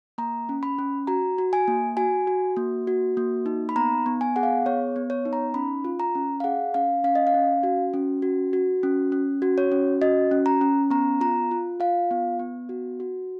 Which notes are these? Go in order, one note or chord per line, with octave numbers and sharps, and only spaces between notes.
A#3 A#5
C#4
B5
C#4
F#4 A#5
F#4
G#5
A#3
F#4 G#5
F#4
A#3
F#4
A#3
D#4
B5
B3 A#5
B3
G#5
G#4 F#5
F5
B3 C#5
B3
C#5
D#4
A#5
C#4 B5
F4
A#5
C#4
F5
G#4 F#5
C#4 F5
C#4 F5
D#5
F5
C#4
F#4
C#4
F#4
F#4
C#4
C#4
F#4
C#5
C#4
F#4 D#5
C#4
A#5
C#4
B3 A#5
F4 A#5
F4
F4 F5
B3
B3
F#4
F#4